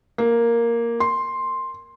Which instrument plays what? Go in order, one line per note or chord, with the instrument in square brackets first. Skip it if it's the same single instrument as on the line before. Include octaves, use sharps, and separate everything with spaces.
[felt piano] A#3
C6